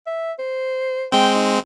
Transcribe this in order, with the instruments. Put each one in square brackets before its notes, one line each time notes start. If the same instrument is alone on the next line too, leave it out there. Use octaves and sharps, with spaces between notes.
[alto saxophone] E5
C5
[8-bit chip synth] G#3 C4 [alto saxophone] G5
[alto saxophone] D#4